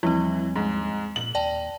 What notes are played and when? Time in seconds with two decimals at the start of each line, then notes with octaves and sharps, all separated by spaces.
0.03 D#2 E3 F3 G3 C4
0.56 G#2
1.16 A#2 F#7
1.35 D#2 D5 G5 A5